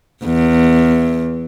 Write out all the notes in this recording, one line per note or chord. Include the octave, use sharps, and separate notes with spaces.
E2